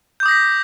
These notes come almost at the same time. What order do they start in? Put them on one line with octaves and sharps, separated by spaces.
G6 D6 D#6 A#6 B6